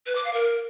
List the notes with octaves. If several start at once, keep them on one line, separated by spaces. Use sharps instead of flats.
B4
D6
F5
A#4